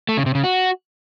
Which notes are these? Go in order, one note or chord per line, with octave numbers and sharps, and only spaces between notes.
A3
C#3
C3
C#3
F#4